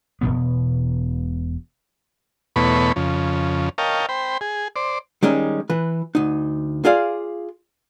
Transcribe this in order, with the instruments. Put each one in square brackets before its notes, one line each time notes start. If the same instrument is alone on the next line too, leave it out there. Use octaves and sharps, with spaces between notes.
[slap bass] E1 D#2 B2 B3
[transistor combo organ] E2 B2 A3 B3 C#5 B5
F2 C#3
A#4 C#5 D#5 F5 G5 A5
C5 G5 B5
G#4
C5 D5
[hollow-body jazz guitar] D#3 G3 G#3 C#4 D#4
E3 B4
D2 D#4
F4 G#4 D5 F5